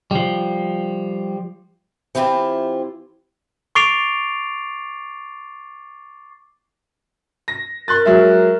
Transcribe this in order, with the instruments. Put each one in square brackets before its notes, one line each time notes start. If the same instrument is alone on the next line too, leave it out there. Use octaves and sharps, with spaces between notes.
[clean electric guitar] F3 G3
[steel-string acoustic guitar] E3 C4 E4 F4 G4
[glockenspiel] C#6 D6 A6 C7 D7 F7
[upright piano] A#6
[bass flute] A#4 [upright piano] C6 F#6 A6
[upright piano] F#3 G#3 E5